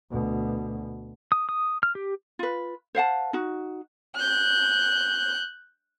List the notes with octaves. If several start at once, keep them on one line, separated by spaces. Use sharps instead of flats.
D2 B2
D#6
D#6
F6
G4
F4 B4
C5 F5 F#5 A5
D#4 F#4
F#6 G6